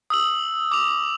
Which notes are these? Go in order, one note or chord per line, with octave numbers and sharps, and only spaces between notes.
D#6 E6 F#7
D6 F7